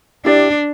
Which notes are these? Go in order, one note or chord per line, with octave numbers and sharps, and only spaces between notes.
D4 E4 G4 D5